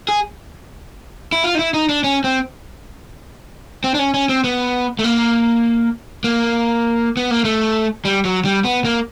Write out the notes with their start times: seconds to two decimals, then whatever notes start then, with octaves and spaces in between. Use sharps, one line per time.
0.09 G#4
1.32 E4
1.44 F4
1.55 D#4
1.59 E4
1.74 D#4
1.89 D4
2.04 C#4
2.24 C4
3.84 C4
3.94 D4
3.99 C#4
4.14 C#4
4.29 C4
4.44 B3
4.99 A3
5.04 A#3
6.24 A#3
7.17 B3
7.31 A#3
7.45 A3
8.05 G3
8.25 F#3
8.45 G3
8.65 B3
8.85 A#3